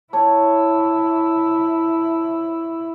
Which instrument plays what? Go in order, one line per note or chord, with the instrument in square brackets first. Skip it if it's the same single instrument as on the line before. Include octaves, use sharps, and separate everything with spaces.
[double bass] E4 [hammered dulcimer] C#5 [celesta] A5